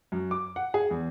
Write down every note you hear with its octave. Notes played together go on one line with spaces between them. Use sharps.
F#2
D6
F#5
G#4
E2